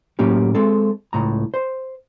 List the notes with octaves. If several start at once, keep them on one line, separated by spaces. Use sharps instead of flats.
A2 F#3 A#3 C#4 G4
G#3 C4 A4
C#2 A2 A#5
C5